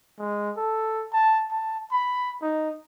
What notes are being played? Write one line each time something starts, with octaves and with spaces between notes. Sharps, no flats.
G#3
A4
A5
A5
B5
D#4